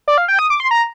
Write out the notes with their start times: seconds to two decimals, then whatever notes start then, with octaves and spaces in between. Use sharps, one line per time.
0.08 D5
0.18 F5
0.28 G5
0.39 D#6
0.50 D6
0.60 C6
0.71 A#5